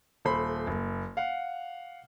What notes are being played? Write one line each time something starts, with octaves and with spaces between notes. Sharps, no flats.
D#1 A4 C5 B5
F#1
F5 F#5